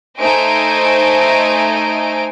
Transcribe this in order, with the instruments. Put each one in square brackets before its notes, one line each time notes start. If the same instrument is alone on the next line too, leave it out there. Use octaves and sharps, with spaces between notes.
[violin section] A3 D#4 C5 D#5 G#5 D7